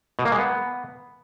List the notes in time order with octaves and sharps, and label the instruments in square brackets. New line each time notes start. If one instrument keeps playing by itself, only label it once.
[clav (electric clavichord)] B2
A#3
G#3
B3